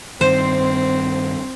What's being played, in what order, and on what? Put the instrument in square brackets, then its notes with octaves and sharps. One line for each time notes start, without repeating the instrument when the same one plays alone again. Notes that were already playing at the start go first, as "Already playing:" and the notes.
[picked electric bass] G2 D#3 [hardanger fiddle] C4 [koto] C5